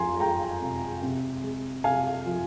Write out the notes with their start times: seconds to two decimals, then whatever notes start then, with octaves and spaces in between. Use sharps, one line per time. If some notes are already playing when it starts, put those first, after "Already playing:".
Already playing: F2 F3 G#5 A#5 C6
0.20 G#3 G5 A#5
0.61 C3
1.03 C3
1.43 G#3
1.84 C3 F5 G#5
2.26 F3